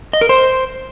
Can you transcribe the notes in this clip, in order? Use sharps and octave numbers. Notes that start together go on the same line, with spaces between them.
D#5
A#4
C5